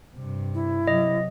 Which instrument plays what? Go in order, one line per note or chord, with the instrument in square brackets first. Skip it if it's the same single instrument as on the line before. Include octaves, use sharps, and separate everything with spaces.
[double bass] G2 C3
[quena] E4
[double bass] C3 F#3 [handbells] D#5